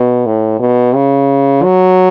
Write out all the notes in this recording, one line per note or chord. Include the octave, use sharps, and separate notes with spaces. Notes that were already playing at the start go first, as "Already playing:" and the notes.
Already playing: B2
A2
B2
C#3
F#3